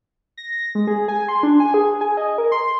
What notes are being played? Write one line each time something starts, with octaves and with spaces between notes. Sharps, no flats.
A#6
G#3
G#4
G#5
C6
D4
G#5
G#4
G#5
D#5
A#4
C6